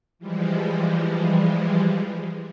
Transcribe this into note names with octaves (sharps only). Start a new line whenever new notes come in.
E3 F3 G3 G#3